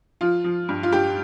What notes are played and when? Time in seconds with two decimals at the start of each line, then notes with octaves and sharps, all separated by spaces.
0.21 F3 F4
0.44 F3
0.69 G2
0.83 F4
0.92 G2 G4